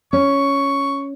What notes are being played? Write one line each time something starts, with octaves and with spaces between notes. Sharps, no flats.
C#4 C#6